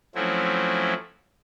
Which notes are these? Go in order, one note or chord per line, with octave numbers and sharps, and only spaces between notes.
F3 F#3 A3 C4 C#4 E4